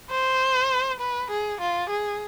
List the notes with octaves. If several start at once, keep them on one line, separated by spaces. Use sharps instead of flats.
C5
B4
G#4
F4
G#4